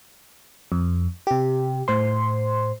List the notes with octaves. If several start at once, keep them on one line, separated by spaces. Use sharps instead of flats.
F2
C3 G4
A2 C5 C6